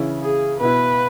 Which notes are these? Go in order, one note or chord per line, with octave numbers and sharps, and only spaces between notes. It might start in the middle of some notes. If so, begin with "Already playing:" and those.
Already playing: C#3 E3 C#4 E4
G#4
B2 B3 E4 B4